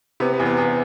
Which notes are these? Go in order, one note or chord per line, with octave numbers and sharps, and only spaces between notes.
C3 B3
B3
E2
B3
E2 B3